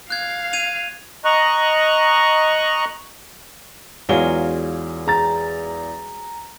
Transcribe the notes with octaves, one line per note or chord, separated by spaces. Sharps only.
F5 F#6 G#6
G#6 D#7 F7
D#5 A#5 C#6 F#6
E2 F#3 G#3 F4 F5 G7
G#4 A#5 A6